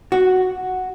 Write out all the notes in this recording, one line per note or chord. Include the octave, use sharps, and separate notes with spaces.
F#4